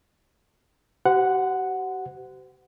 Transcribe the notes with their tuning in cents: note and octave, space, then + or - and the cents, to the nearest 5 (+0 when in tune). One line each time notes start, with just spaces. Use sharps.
G4 -45 C5 -35 F#5 +0